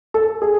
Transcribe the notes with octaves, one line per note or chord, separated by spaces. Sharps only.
A4
G#4